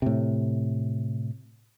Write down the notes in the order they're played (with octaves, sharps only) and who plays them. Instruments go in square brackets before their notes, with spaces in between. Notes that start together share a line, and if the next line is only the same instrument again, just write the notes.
[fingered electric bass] A2 C3